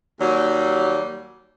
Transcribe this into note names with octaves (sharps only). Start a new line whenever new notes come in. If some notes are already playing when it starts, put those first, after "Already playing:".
D#2 F#3 G3